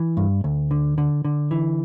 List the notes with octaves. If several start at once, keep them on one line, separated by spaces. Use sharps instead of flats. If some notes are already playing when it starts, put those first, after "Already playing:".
Already playing: E3
G2
D2
D3
D3
D3
E3